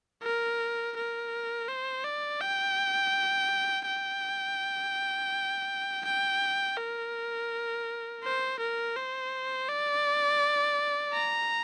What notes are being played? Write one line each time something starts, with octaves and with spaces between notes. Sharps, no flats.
A#4
A#4
C5
D5
G5
G5
G5
A#4
C5
A#4
C5
D5
A#5